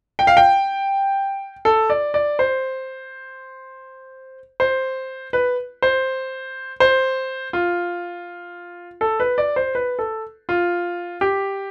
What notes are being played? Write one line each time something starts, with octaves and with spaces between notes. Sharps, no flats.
G5
F5
G5
A4
D5
D5
C5
C5
B4
C5
C5
F4
A4
B4
D5
C5
B4
A4
F4
G4